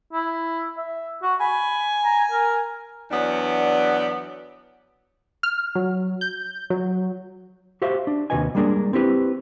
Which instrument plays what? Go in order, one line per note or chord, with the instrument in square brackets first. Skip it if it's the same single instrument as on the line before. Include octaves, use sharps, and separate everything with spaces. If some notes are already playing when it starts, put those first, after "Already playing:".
[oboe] E4
E5
F#4
[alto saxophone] G#5 [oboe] B5
[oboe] A#5
A#4
[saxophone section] E2 F#3 B3 D4 D5
[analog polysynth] F6
F#3
G6
F#3
[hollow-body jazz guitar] F#4 G4 C5 E5 F5
D4
D#2 C3 F#4 B4 D#5 G#5
G3 G#3 A#3 D4 G#4 A#4
C4 E4 G4 B4